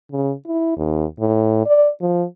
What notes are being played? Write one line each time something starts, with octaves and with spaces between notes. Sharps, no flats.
C#3
E4
D#2
A2
D5
F3